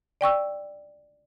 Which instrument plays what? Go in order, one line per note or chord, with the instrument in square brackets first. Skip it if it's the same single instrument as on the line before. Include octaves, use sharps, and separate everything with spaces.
[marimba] D5 G5 C#6 E6